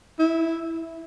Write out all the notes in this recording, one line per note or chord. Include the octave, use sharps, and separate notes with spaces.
E4